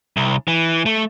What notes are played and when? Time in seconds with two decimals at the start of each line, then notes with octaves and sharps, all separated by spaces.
0.17 C2
0.48 E3
0.86 A3